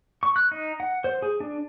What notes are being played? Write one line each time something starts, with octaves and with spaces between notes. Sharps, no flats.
C#6
F#6
D#4
F#5
C5
G#4
D4